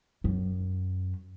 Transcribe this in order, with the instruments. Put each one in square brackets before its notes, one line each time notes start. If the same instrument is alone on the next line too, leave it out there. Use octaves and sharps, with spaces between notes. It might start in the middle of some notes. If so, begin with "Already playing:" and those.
[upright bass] F#2